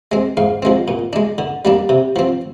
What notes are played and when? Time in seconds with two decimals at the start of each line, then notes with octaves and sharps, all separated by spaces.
0.12 G#3 C4
0.37 G#2 F5
0.62 F3 G#3 C4
0.88 A#2
1.13 G#3 D4
1.38 D3
1.65 G3 A#3 D4
1.89 C3
2.16 F3 C4